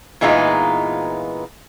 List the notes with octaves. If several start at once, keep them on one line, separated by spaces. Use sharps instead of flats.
A#2 E3 G#3 B3 D#4 F4